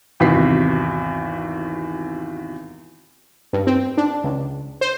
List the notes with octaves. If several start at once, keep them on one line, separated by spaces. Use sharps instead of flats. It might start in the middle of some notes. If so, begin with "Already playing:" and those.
G#1 E2 C3 F#4 B6 C7
G2
C4
D4
C#2
C5